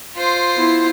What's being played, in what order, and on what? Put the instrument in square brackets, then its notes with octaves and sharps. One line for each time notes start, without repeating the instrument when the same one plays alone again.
[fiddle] F4 C5
[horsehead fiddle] B3 E4